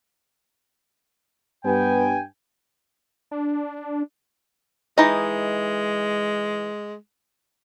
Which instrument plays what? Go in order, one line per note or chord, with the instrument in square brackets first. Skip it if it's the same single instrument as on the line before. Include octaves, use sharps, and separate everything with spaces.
[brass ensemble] G2 G5 G#5 [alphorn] B3
[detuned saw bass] D4
[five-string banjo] E3 D#4 D#5 [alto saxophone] G#3